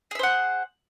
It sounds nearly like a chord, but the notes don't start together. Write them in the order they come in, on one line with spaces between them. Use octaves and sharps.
G#4 E5 C5 F#5